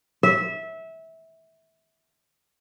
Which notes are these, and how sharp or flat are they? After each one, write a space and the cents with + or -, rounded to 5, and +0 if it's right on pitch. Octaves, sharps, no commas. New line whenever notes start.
E5 -20